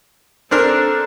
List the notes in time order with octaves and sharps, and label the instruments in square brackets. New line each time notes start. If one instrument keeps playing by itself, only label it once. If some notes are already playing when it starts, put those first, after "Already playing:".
[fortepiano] C4 D4 A#4 [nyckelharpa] A4